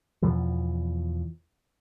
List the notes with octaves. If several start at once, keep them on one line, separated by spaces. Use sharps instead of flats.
E2 B2 E3 F3